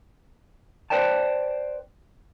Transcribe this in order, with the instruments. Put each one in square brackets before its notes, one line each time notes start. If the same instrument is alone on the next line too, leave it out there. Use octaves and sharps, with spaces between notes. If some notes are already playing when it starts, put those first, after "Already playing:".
[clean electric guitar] B4 C5 D5 G5 A5